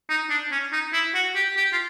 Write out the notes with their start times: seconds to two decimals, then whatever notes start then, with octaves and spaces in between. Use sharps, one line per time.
0.10 D#4
0.30 D4
0.52 C#4
0.73 D#4
0.93 E4
1.15 F#4
1.35 G4
1.57 G4
1.73 F4